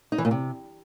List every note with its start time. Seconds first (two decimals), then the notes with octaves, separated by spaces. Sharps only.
0.12 D#4
0.18 E3
0.25 A#2
0.31 C3